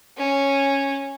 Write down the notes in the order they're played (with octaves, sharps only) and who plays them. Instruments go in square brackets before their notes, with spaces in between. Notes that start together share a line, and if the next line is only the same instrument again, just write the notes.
[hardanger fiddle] C#4